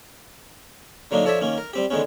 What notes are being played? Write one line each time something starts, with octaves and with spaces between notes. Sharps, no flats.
D3 F#3 A#3 D4 D#4
F3 A4 C#5 D5 E5
D#3 A#3 C#4
A#4
G3 C4 G4
D3 D#3 G#3 B3 C#4